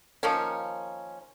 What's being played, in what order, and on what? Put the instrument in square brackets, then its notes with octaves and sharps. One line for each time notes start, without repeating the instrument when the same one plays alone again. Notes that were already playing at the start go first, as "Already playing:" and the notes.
[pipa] D#3 F3 A#3 C#4